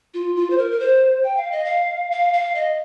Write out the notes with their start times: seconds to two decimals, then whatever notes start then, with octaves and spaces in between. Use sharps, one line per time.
0.14 F4
0.36 F4
0.50 C5
0.58 A#4
0.71 A#4
0.80 C5
1.24 G5
1.37 F5
1.52 D#5
1.65 F5
2.11 F5
2.33 F5
2.55 D#5